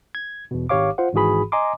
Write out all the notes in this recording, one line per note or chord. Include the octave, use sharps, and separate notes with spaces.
G#6
E2 B2
G#1 G4 C#5 F5 D6
F4 C5 F#5
G#1 G#2 E3 F#4 G#4 B5
D#5 G#5 A#5 C6 D6